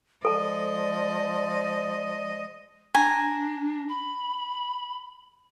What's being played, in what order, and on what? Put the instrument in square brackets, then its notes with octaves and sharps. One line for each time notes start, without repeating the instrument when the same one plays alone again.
[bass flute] F3 [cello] G#3 D#5 [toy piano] A4 A5 [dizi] D5
[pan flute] D4 [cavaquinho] G#5 A#5
[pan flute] B5